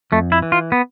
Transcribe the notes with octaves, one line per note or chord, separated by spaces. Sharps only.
F2 A3
E4
E3
F4
B3